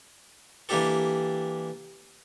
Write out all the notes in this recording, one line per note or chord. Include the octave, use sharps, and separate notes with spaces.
E3 G3 A#3 D4 G4 A4